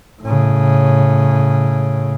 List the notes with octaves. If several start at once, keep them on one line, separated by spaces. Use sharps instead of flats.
A2 C#3